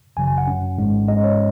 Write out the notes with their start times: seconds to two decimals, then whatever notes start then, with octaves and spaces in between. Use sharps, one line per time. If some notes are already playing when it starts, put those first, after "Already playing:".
0.16 G#1 F#2 C#3 F#3 G#5
0.27 G#5
0.38 F#5
0.47 F#2 F#3 C#4
0.78 G#1 G#2 G#3 C#4
1.08 G#2 G#3 C#4 D#5
1.24 C#5